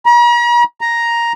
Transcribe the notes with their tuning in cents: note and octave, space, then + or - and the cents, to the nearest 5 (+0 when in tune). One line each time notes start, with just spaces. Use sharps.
A#5 +45
A#5 +5